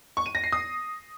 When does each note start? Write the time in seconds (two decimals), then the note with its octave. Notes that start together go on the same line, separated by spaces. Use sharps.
0.17 C#6
0.26 D#7
0.35 A#6
0.44 C7
0.52 D#6